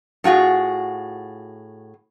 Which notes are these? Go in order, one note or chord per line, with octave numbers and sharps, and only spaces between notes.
A2 F4 F#4 G#4